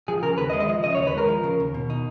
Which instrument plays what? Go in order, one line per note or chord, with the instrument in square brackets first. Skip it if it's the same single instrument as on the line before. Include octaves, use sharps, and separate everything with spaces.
[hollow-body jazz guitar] F3 [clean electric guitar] G#4
[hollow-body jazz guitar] C#3 [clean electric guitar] A#4
[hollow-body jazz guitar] D#2 [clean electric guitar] B4
[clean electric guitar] D#5
[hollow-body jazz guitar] G#3
[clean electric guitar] D#5
[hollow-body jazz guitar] F3
[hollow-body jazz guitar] C#3 [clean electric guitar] D#5
[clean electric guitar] C#5
[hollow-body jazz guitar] D#2
[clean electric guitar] B4
[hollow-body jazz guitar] G#3 [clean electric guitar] A#4
[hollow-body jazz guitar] F3
C#3
D#2
B2
D#4